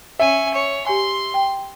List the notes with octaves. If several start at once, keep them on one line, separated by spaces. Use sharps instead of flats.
C#4 E5 G#5
C#5
G4 G#5 C6
G5